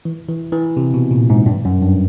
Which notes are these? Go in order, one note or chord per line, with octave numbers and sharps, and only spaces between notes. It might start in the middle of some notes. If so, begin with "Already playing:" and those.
E3
E3
E3
C3
B2
A#2
G#2
G2
F#2
G2